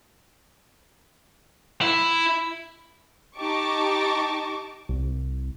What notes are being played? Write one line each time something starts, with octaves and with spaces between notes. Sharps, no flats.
E4
D#4 G4 A5 C#6 D6
C2